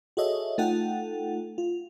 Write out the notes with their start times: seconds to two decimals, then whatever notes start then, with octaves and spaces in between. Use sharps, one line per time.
0.17 F#4 G#4 A4 C#5 D#5 E5
0.58 A3 D#4 F4 A4 F#5 G5
1.58 F4